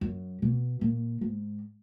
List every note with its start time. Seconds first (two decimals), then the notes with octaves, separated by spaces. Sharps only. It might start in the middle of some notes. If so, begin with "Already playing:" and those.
0.01 F#2
0.42 B2
0.81 A#2
1.21 G#2